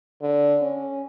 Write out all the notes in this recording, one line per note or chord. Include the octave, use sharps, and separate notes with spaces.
D3
C#4